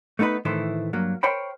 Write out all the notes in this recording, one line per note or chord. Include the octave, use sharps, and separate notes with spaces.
A3 B3 D#4 E4 B4
A2 D#3 E3 A3 E4 C5
G2 F#3 A#3
A#4 C5 C#5 G5 B5